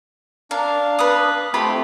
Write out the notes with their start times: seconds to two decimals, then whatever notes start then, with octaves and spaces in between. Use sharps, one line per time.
0.51 D4 A#4 F5
0.99 B4 D#6
1.54 A3 C4 F4 G4 B5